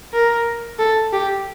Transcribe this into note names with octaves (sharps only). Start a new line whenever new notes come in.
A#4
A4
G4